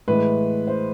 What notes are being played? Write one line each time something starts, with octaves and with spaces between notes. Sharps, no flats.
A2 E3 G#3 B4
C5